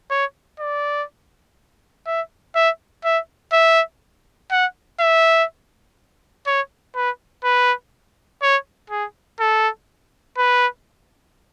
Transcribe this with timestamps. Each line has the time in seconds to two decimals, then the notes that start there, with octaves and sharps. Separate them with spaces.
0.10 C#5
0.59 D5
2.06 E5
2.55 E5
3.04 E5
3.52 E5
4.51 F#5
5.00 E5
6.46 C#5
6.95 B4
7.44 B4
8.42 C#5
8.90 G#4
9.40 A4
10.37 B4